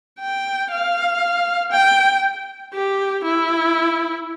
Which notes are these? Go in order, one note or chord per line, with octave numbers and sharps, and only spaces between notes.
G5
F5
G5
G4
E4